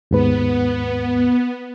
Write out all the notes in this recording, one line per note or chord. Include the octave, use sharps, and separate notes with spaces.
D#2 G#2 B3 B4